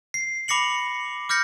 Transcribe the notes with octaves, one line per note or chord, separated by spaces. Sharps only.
C7
B5 D6 A#6 C#7 F#7
D6 F6 G6 A#6 C#7